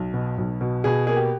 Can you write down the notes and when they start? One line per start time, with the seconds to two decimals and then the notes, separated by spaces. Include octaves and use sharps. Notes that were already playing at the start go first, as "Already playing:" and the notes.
Already playing: B1
0.14 B2
0.38 B1
0.61 B2
0.84 B2 G#4
1.07 A#3 G#4
1.16 G4